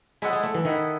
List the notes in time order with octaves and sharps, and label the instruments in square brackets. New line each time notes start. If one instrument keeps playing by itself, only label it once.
[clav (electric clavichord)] G#3 [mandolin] E4 A4 D#5 F#5
[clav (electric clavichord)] G#3
A3
E3
[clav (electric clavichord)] D#3 [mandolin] E4 A4 D#5 F#5